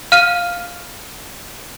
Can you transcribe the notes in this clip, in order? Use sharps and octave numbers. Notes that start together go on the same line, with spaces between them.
F5 F6 D#7